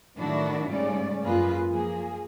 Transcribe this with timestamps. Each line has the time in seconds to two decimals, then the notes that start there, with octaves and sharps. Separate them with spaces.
0.17 A2 D#3 F#3 D4 E4 F#4
0.67 G#2 C#3 G3 A3 C#4 D5
1.23 F#2 A#3 F4 G#4 B4
1.68 F3 A#3 G#4